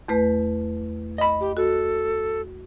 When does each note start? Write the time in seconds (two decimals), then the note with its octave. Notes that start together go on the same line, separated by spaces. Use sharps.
0.08 E2 A3 B4
1.18 D#5 B5
1.41 G4
1.57 F#4 A4